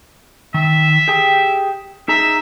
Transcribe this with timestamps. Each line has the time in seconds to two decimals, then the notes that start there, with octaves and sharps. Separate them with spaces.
0.54 D#3 E5
1.08 G4 G#4 G5
2.08 D#4 G#4 E5 A#5